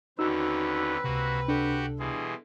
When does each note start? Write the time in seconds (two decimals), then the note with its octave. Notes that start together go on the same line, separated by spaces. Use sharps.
0.19 D#2 D3 C4 C#4 D#4 F#4 B4 E6
1.04 C#2 C3 A#3 F#4
1.48 D4 F#4 G4 A4 F#5
1.99 B2 E3 G3 G#4 C6